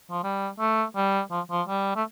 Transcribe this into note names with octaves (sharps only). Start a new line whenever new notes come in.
F3
G3
A3
G3
F3
F3
G3
A3